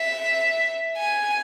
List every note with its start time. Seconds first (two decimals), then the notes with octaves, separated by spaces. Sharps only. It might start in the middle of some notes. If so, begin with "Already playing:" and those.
Already playing: E5
0.97 G#5